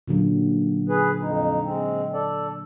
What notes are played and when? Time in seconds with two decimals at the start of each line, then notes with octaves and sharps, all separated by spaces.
0.08 A#2 D3 F#3
0.89 G#4 B4
1.21 F2 D#4
1.63 G#3 C4
2.13 A4 D5